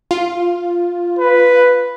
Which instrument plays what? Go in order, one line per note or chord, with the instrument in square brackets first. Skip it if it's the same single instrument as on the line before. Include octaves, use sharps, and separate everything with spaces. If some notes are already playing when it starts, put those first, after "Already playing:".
[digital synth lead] F4
[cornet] B4